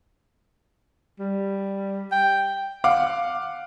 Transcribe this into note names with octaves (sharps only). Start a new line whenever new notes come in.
G3
G5
F5 F#5 D6